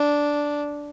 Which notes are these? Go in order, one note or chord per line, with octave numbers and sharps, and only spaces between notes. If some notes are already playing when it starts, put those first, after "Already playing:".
Already playing: D4